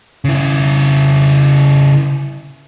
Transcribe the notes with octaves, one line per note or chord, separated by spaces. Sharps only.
C#3 E4